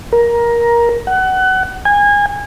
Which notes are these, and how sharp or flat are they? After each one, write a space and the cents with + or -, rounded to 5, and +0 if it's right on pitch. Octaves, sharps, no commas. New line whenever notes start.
A#4 +15
F#5 +25
G#5 -25